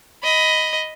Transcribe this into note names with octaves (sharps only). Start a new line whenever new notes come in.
D#5 B5